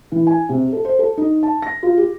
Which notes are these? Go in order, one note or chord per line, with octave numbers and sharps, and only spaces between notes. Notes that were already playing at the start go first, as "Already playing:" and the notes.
E3
G#5
C3
A4
C5
A4
D#4
A5
A#6
F4
G4